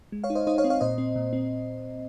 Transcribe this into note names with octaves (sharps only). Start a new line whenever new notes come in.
G#3
C#5 F5
D#4
C5 D#5
D#4 C5 D#5
C#5 F5
C4
C#5 F5
A#2 C5 D#5
C4
A#2
C4